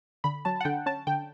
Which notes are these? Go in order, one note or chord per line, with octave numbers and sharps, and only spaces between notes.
D3 B5
F#3 A5
F#5
D3 G5
C#4 A5
D3 G5